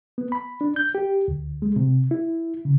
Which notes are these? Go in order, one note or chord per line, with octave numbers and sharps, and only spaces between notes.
B3
B5
D4
G6
G4
D2
G#3
C3
E4
C#3